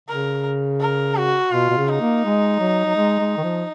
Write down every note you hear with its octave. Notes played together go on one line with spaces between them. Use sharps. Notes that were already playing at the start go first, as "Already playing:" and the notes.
C#3 A#4
A#4
F#4
B2 F4
B2
C#3
D#4
A#3
G#3
F#3
F#3
G#3
G#3
D#3
F3